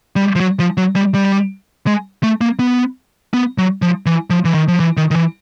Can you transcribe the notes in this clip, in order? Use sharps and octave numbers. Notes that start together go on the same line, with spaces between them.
G3
F3
F#3
F3
F#3
G3
G3
G#3
A3
A#3
B3
B3
F#3
F3
E3
F3
E3
D#3
F3
E3
D#3
D#3
E3